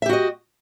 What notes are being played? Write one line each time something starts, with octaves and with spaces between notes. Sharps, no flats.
F#4 G4 D#5 E5